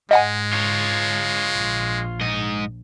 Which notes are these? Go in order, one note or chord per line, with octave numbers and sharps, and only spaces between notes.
G#2 G#3 D#5 F#5 G#5
F4 C#5
A#1
G#2 D#5